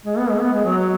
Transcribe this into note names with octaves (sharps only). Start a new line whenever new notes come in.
G#3
B3
G#3
B3
G#3
F#3